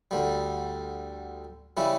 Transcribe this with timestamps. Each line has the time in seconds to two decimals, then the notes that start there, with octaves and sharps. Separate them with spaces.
0.11 D2 D3 G3
1.77 C#3 G3 C#4 E4